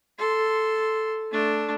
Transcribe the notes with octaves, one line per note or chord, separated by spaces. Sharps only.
A4 C6
A3 D4